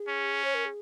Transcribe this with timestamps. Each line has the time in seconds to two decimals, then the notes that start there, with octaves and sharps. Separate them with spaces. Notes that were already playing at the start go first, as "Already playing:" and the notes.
Already playing: G#4
0.08 C#4
0.44 C#5
0.54 A#4
0.65 G#4